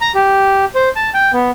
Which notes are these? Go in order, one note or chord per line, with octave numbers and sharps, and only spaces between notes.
A#5
G4
C5
A5
G5
B3